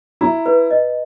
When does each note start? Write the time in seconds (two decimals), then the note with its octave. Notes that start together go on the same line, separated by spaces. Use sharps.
0.21 E4 A#5
0.46 B4
0.71 D#5